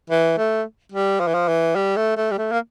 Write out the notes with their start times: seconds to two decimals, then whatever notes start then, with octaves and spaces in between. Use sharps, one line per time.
0.10 E3
0.38 A3
0.92 G3
1.20 F3
1.27 E3
1.34 F3
1.48 E3
1.76 G3
1.96 A3
2.17 A3
2.31 G3
2.38 A3
2.52 A#3